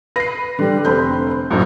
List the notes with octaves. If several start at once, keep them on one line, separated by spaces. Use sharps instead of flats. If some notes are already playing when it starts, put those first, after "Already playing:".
B4 A#6 C7
D3 G3
F1 C4 B5 G6
F#1 B1 F#2 A2